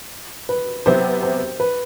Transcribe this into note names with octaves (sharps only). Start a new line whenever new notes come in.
B4
C3 F#3 B3 E4 G4 C5
C5
B4